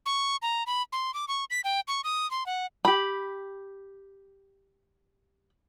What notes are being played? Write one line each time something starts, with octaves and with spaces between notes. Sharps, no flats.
C#6
A#5
B5
C6
D6
C#6
B6
G5
C#6
D#6
C6
F#5
G4 B5